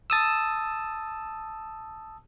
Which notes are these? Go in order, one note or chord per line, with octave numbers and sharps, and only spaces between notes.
A5 D#6 E6